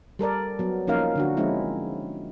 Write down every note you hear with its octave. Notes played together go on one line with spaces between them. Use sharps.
G3 A4 A#4 D5
F#3 B3
F3 A#3 C#4 D#4 A#4 F5
D3 D4 F#4
F3 G#3 C4 C#4 D#4 E4